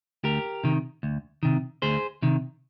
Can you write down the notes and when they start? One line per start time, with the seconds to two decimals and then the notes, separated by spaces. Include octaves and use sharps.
0.24 D2 G4 A#4
0.64 C3 D#3
1.03 D2
1.43 C3 D#3
1.82 D2 G#4 C5
2.22 C3 D#3